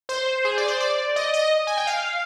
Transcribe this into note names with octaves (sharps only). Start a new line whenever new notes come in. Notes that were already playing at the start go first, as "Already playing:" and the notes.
C5
G#4
D5
C5
D5
D#5
D#5
G#5
G5
F5